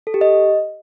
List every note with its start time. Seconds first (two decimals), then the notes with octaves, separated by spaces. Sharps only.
0.07 A4
0.14 G4
0.21 D#5